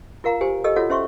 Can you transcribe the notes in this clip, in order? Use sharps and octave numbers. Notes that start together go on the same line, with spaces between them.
F4 A#4 F5 A#5
G4 C5 G#5
G4 A4 D#5 E6
F4 F#4 A4 C#5 F#5
C#4 C5 E5 C6 C#6